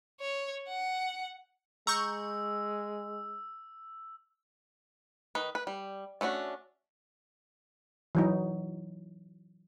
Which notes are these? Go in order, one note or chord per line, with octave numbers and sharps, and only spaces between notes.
C#5
F#5
G#3 A#5 C#6 E6 G6
D#3 D#4 B4
B4
G3
A3 C#4 D4 F#4
E3 F#3 D#4